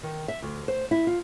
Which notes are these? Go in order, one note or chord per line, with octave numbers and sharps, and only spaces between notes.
D#3
E5
D2
C5
E4
F4